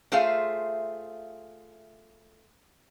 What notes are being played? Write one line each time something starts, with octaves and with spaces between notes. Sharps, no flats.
A3 F4 G#4 C5 E5 F5